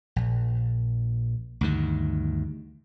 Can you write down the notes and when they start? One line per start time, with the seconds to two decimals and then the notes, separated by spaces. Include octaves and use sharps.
0.16 A#1
1.61 D2 G2 D#3